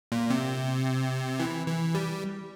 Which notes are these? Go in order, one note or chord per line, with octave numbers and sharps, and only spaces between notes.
A#2
C3
E3
E3
G3